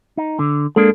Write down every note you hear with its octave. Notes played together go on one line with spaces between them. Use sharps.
D#4
D3
G#3 A#3 D4 A4